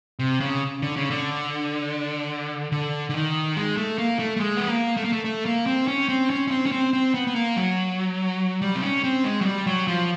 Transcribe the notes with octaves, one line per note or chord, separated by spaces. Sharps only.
C3
C#3
D3
C#3
D3
D3
D3
D#3
G#3
A3
A#3
A3
A3
G#3
B3
A#3
A3
A#3
A3
A3
A#3
C4
C#4
C4
C#4
C#4
C4
C#4
C4
C4
B3
B3
A#3
F#3
G3
C4
C#4
C4
G#3
F#3
G3
F#3
F3